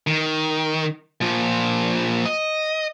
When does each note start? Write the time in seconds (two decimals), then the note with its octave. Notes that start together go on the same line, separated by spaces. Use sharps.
0.07 D#3
1.21 A#2 F3
2.26 D#5